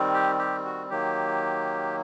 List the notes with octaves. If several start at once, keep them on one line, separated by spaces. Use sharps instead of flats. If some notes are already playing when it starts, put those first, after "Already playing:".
Already playing: D#3 G3 C4
G4
G4
F#4
D#3 F#3 A#3 G4